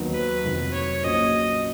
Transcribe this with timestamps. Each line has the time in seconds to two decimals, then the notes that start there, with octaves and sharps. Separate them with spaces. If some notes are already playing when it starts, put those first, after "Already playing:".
Already playing: D#2 D#3 F#3 B3
0.13 B4
0.43 F1 F2 D#3 F#3
0.73 C#5
1.03 A#1 A#2 F#3 C#4 F#4 D#5